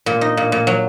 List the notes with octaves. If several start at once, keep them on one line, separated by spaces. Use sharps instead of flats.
A#2
D#4
A#2
A#2
F#3